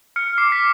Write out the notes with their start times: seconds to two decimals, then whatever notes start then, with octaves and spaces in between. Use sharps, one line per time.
0.16 F6 C#7
0.38 D6 C7
0.52 B6